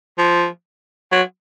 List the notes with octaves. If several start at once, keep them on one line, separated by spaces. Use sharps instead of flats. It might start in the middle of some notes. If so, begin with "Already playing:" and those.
F3
F#3